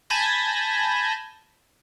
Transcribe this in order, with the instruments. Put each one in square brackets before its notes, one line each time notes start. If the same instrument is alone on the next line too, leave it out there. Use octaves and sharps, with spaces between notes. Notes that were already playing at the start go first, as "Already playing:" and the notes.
[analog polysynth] G#5 A5 B5 G6 G#6 A#6